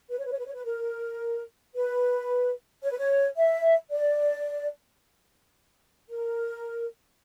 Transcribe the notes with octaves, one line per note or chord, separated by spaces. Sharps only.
B4
C#5
B4
C#5
B4
C#5
B4
A#4
B4
C#5
B4
C#5
E5
D5
A#4